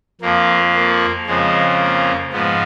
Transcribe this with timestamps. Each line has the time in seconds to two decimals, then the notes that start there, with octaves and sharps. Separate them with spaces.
0.21 F2 F3 A#3
0.74 A#3
1.27 F2 C#3 F3 G#3
1.80 A#3
2.33 G#2 F3 B3